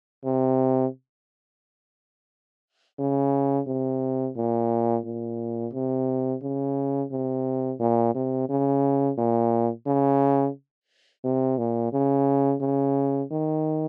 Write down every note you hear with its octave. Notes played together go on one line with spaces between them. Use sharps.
C3
C#3
C3
A#2
A#2
C3
C#3
C3
A#2
C3
C#3
A#2
C#3
C3
A#2
C#3
C#3
D#3